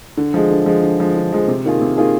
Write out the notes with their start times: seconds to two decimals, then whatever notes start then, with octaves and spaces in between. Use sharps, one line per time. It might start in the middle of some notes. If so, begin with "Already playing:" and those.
0.17 D3
0.34 F3 G#3
0.51 D3
0.66 F3 G#3
0.83 D3
1.00 F3 G#3
1.15 D3
1.32 F3 G#3
1.48 C3
1.65 D#3 A#3 F4 G#4
1.81 C3
1.97 D#3 A#3 F4 G#4